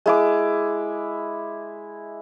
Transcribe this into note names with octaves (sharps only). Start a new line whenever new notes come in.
G#3 E4 D6